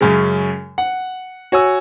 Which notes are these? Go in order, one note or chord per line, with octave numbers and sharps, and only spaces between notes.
F#2 C#3 G#3
F#5
F#4 C#5 G#5 E6